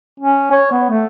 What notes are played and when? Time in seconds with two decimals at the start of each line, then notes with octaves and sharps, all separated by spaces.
0.20 C#4
0.52 C#5
0.72 B3
0.90 A3